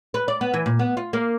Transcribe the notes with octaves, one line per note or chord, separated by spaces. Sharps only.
B4
D5
B3
E3
A#2
B3
F4
A#3